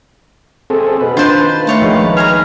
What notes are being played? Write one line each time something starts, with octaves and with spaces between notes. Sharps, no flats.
C4 G#4 A4
B2 B4
D#3 D4 F4 C5
A3 F4 C#5 A5
A#1 D#3 G#3
G#4 G#5 A#5 F6